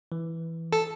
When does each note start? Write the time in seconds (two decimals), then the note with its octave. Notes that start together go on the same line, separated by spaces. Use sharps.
0.12 E3
0.72 A4